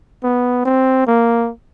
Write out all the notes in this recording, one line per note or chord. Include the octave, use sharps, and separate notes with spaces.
B3
C4
A#3